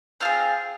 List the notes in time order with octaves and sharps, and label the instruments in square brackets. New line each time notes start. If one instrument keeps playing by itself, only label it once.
[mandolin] C4 F4 G#4 F6